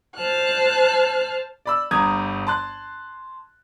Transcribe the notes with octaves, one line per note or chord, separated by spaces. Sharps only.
C5 A5 F6 F#6
D5 B5 E6
G1 G2 A#5 D#6 G#6
A5 C6 F#6